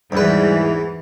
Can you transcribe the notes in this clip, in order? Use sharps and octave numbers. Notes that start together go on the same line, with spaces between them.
E2 G#2 E3 G3 B4